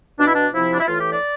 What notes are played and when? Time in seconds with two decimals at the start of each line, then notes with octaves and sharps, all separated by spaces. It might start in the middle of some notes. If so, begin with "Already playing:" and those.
0.19 B2 D4
0.27 E4
0.35 D4
0.53 C3 F3 E4
0.72 D4
0.80 E4
0.88 A2 E3 F4
1.00 G4
1.11 D5